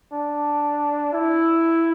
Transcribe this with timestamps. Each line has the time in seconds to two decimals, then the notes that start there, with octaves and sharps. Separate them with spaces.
0.13 D4
1.13 E4